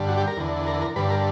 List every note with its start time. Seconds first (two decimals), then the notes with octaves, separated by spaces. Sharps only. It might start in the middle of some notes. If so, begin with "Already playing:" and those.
Already playing: G2 D3
0.08 F#4
0.17 G4
0.27 A#4
0.37 E2 D3
0.67 A#4
0.81 A#4
0.96 G2 D3 B4
1.10 A#4